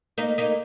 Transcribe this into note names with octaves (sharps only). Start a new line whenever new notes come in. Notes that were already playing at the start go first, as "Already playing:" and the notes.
A#3 D#4
A#3 D#4